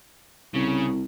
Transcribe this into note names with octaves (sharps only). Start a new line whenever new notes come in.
C2 C#3